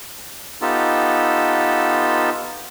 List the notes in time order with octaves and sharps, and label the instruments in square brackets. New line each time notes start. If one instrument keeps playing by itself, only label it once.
[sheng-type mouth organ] B3 D#4 F4 G4 A4